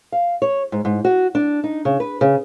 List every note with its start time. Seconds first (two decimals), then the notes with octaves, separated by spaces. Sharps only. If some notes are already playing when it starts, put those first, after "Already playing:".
0.12 F5
0.42 C#5
0.72 G#2
0.85 G#2
1.05 F#4
1.35 D4
1.64 D#4
1.85 C#3
2.00 B4
2.21 C#3